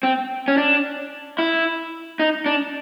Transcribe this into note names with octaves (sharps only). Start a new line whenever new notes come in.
C4
C#4
D4
E4
D#4
D4